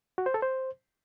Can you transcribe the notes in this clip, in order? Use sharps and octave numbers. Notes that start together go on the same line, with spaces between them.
F#4
C5
A4
C5